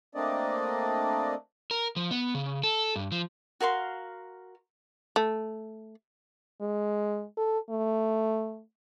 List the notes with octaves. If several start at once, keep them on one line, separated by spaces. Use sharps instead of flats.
A3 A#3 C4 D4 D5 D#5
A#4
F3
B3
C#3
A4
G2
F3
F#4 A#4 F5 C6
A3
G#3
A4
A3